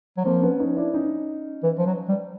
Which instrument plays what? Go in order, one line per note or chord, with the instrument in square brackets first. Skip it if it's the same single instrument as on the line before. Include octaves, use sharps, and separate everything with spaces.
[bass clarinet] F#3
[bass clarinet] F3 [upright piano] A#3 C4
[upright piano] B3 C#4
C#4 D#4
D4 E4
C#4 D#4
[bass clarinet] E3
F3
F#3
G3